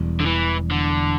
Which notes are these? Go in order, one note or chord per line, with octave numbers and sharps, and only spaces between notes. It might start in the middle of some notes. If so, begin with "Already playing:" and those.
Already playing: E1 E2 B2 G3
D3
E3
D3